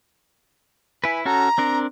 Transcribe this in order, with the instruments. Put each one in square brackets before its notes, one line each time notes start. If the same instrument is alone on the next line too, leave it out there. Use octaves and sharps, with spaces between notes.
[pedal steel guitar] E4 B4 [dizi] G#5
[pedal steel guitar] C#4 F#4 A4 [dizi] A#5
[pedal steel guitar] C4 D4 A#4